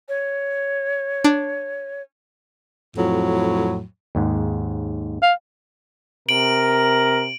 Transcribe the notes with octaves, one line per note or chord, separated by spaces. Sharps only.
C#5
D4
F2 A2 F#3
D#2 G#2
F5
C3 A#4 D7 F#7